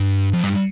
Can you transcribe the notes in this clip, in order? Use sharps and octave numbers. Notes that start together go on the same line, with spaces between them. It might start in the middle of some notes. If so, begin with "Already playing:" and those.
Already playing: G2
F2
G2